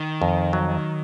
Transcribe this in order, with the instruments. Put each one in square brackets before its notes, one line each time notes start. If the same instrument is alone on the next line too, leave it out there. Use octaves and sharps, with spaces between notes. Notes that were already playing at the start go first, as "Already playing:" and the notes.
Already playing: [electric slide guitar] D#3
[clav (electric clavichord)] F2
F#3